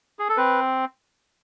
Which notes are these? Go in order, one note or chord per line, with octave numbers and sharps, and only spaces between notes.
G#4
A4
C4 B4